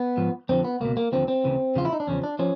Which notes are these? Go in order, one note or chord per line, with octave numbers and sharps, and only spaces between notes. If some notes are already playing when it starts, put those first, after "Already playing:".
Already playing: B3
G#2 F3
F2 D3 F3 C4
B3
C#2 B2 A#3
A#3
D#2 D3 F3 C4
C4
D2 C#3 E3
E2 C#3 F3 F4
E4
D#4
D4
E2 C#3 F3 C#4
D4
F3 C#4